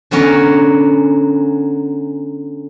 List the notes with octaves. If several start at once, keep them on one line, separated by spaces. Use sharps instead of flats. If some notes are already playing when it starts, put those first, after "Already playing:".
D3 F#3 B3 C#4 A#4